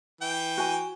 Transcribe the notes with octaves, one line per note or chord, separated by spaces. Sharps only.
E3 G5
F#4 G#5